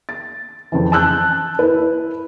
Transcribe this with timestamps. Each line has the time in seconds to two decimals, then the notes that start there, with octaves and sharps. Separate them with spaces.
0.09 A6
0.72 F2 C#3 E3
0.92 A5 E6 F#6 G6
1.59 E4 B4